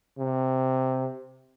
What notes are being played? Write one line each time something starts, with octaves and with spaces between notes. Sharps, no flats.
C3